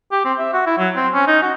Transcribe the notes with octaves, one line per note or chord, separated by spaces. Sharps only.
G4
C4
E5
F#4
E4
F#3
C4
C#4
D#4
F#4